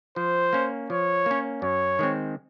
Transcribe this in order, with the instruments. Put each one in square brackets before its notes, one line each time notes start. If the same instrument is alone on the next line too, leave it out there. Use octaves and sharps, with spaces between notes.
[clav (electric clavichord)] F3 [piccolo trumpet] C5
[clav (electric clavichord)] A#3 C#4
[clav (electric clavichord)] F3 [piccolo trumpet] C#5
[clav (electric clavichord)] A#3 C#4
[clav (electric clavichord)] F#2 [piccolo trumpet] C#5
[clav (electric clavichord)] D#3 G#3 C4